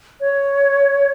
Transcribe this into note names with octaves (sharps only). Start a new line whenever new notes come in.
C#5